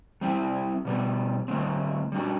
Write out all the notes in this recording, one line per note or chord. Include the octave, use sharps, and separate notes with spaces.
G3 C4 E4
B2 G3 B3
D3 A3 C4
G3 D4 F#4